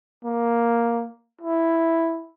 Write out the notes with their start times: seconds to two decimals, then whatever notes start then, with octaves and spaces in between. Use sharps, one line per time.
0.25 A#3
1.41 E4